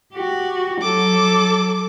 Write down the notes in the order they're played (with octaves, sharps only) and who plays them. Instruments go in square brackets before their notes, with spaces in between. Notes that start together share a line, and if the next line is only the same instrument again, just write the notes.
[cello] F#4 G4
[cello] F#3 [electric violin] A4 D6